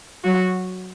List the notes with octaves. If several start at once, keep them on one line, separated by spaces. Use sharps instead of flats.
F#3 F#4